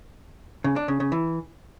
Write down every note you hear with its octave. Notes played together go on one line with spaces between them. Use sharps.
C#3
D4
C#3
C#3
E3